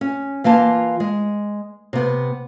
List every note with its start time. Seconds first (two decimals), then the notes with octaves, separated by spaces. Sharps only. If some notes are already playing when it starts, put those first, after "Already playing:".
0.01 C#4
0.44 E3 A#3 F4 A5
1.00 G#3
1.93 C3 B3